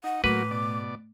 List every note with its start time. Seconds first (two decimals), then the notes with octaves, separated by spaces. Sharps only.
0.04 D#4 F#5
0.24 A2 F#3 A#3 F#4 B4 D6
0.51 B2 D5